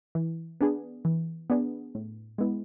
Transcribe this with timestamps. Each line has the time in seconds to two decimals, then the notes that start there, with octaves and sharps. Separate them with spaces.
0.15 E3
0.61 B3 D4 G#4
1.05 E3
1.50 B3 D4 G#4
1.95 A2
2.38 G#3 B3 E4